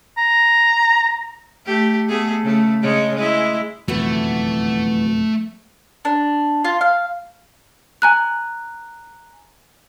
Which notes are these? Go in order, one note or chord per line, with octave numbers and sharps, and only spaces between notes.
A#5
A3 G4
A3 B3 G#4
C#3 A3
C#3 G#3 C#5
G#3 E4
F#1 F2 B2 E3 A3 B3 F#4
D4
F4
F5
G#5 A#5 F#6